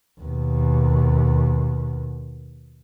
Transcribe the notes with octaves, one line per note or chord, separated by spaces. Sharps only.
D#2 B2